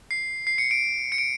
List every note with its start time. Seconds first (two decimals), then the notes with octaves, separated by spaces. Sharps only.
0.11 C7
0.47 C7
0.58 C#7
0.71 D7
1.12 C#7
1.18 D7